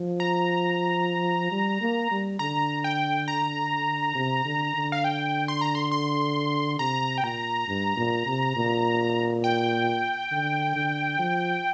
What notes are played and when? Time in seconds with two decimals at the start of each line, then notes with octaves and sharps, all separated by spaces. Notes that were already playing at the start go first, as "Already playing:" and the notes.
Already playing: F3
0.20 A#5
1.52 G3
1.81 A#3
2.11 G3
2.39 D3 A#5
2.84 G5
3.28 A#5
4.15 C3
4.45 D3
4.74 D3
4.92 F5
5.04 G5
5.48 C6
5.61 A#5
5.75 C6
5.91 C6
6.79 C3 A#5
7.18 G5
7.23 A#2 A#5
7.68 G2
7.97 A#2
8.26 C3
8.56 A#2
9.44 G5
10.31 D3
10.76 D3
11.19 F3